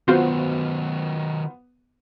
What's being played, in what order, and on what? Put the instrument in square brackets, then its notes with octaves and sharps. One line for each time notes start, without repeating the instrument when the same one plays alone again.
[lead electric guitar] D#3 F#3 [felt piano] B3 [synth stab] F4 F#4 C5